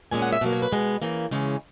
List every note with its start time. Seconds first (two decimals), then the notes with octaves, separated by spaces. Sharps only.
0.11 A#2 G#3 C#4 G#5
0.22 F#5
0.33 E5
0.41 B2 F#3 A#3
0.53 C#5
0.62 B4
0.72 B2 G#3 B3
1.02 C#3 E3 A#3
1.31 C#3 E3 G#3 C#4